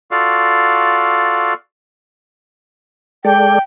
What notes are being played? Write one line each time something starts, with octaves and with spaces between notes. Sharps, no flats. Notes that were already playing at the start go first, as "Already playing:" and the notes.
F4 F#4 A4 D5 F5
G#3 A4 D5 G5